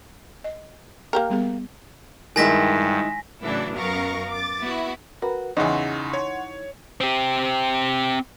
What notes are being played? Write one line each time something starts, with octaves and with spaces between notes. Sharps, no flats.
D#5
A#3 G4 A#4
G3 B3 G#4
G2 D#3 G#3 E4 G#5 A#6 B6
A2 C#3 E3 F#3 D4 E4
F#2 B3 A#4 F5 C#6 A#6
D6 A6
B3 E4 F#4
F#4 A#4 B4
E2 C#3 E3 D#4 F#5 C6 C#6
C#5
C4 G4